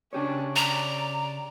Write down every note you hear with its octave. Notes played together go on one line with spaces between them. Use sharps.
C#3 C#4 D4 G4 C#5
D5 A#5